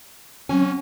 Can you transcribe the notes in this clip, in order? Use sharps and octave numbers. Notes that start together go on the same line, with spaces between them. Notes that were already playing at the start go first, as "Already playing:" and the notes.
F#3 C4 C#4 G#5